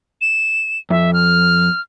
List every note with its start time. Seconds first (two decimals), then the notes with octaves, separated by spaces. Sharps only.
0.21 E7
0.90 F2 E5
1.13 F6